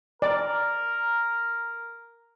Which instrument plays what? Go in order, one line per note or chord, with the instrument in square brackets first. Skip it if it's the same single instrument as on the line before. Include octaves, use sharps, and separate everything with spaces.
[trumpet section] A#4 [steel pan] D5